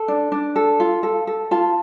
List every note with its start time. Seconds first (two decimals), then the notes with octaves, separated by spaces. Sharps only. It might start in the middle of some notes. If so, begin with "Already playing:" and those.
Already playing: A4
0.08 D4
0.32 D4
0.56 A4
0.80 F4
1.03 A4
1.27 A4
1.51 F4 A5